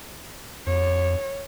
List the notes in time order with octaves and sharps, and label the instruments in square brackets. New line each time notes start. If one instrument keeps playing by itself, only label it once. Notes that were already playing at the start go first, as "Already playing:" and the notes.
[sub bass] F2 [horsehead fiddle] C#5